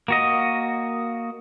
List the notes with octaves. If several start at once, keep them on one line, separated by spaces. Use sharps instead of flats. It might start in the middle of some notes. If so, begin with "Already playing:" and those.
A#3 F#4 D#5